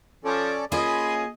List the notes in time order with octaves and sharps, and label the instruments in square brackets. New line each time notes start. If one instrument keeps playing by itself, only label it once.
[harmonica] F3 [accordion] C#4 A4 D5
[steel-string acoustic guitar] A#3 C#4 F4 [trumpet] G#4 [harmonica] D#5 [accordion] B5 C6 D#6